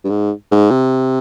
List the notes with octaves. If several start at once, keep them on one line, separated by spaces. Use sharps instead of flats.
G2
G#2
G#2
C3